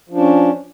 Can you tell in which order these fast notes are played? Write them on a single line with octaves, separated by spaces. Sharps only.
F3 D4 C#4